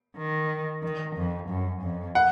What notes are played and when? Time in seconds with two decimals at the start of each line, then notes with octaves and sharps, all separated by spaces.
0.17 D#3
0.83 D#3
1.16 F2
1.49 F#2
1.82 F2
2.15 F#5